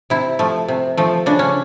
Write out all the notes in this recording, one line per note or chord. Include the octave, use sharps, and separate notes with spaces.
C3 E4
F3 A3
C3
F3 A3
C#3 D4
C#4